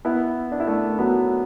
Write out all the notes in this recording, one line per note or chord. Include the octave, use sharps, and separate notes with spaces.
B3 E4
D4
E4
A3 D4
F#3 B3